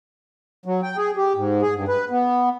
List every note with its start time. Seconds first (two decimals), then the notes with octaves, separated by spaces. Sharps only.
0.66 F#3
0.83 G5
0.97 G#4
1.17 G4
1.36 G#2
1.62 G#4
1.75 G2
1.88 B4
2.10 B3